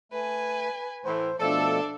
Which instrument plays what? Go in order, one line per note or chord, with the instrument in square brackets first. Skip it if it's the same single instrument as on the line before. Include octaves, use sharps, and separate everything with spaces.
[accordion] A3 [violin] B4 G#5
[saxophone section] A2 E3 [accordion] C5
[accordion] B2 F3 A3 [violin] D4 D5 [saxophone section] A4